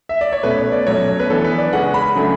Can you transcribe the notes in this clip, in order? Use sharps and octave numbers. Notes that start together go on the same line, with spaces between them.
E5
D5
C#5
B2 A3 C#4 B4
C#5
D5
B2 F#3 A3 C#4 C#5
B4
E3 B3 D4 A4
B4
D5
C#3 G#3 C#4 F#5
B5
C#3 F#3 A3 D4